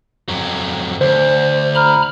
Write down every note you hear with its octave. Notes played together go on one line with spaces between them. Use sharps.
F2 F#3
D2 C5
A#5 B5 F6